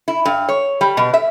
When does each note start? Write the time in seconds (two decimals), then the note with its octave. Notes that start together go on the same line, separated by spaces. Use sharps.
0.08 E4
0.25 G2
0.48 C#5
0.81 G3
0.97 B2
1.14 E5